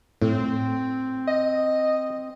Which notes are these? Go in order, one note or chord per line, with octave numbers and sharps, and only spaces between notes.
A2 C4
D#5